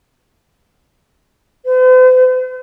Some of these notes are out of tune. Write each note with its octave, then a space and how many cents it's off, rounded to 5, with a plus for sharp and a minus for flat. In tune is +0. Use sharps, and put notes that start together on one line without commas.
C5 -45